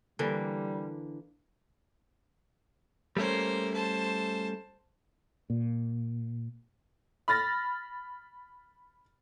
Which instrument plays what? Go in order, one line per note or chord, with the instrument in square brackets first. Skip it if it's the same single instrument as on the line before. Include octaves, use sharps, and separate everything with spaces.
[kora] D3 E3 A#3 [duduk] G3
[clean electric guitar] G3 A3 C#4 [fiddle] A#3 C5
[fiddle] C5 A5
[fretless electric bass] A#2
[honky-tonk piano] B5 F6 A6 A#6